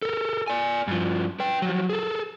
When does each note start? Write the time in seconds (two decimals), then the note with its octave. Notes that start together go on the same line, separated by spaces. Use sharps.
0.02 A4 A#4
0.48 D5 G#5
0.88 G2 F3
1.40 B4 G5
1.62 F3 F#3
1.89 G#4 A4